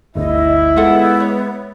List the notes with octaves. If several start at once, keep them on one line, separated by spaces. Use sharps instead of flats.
G1 D2 E4 D#5 E5
G#3 B3 F4 A4 F#5
C#5